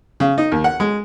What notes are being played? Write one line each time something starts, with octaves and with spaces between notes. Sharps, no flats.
C#3
D#4
D#2
F#5
G#3